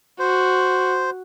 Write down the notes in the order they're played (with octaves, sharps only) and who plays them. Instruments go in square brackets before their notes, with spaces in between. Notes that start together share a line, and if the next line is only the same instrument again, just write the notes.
[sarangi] F#4 [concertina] C5